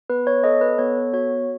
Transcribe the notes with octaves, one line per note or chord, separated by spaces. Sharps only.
B3 B4
C#5
A4 D#5
B4
B3 C#5
F#4 C#5